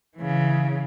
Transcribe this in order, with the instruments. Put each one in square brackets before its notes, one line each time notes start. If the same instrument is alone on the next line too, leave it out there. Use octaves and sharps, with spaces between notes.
[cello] C#3 E3